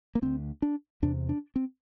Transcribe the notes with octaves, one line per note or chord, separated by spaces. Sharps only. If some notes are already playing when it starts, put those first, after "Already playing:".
A#3
D2 D3 C4
D4
E2 C3 D4
D4
C4